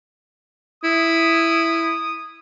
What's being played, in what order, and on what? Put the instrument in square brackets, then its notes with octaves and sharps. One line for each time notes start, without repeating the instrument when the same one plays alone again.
[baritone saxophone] E4 [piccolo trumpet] D#6